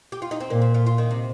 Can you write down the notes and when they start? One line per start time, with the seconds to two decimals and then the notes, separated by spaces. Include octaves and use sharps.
0.12 G4
0.22 F4
0.31 D#4
0.40 C4
0.50 A#2 A#3
0.62 C4
0.74 F4
0.86 F4
0.98 D#3
1.11 C3